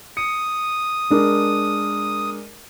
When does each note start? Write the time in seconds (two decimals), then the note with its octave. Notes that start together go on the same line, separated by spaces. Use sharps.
0.17 D#6 C#7
1.10 G#3 D4 A#4